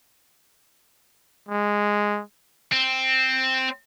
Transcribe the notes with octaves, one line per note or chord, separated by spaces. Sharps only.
G#3
C4